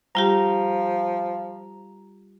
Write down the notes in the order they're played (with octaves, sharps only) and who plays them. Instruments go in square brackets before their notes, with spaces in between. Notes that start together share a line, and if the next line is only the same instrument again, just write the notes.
[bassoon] F3 [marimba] G3 F4 G4 [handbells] A#5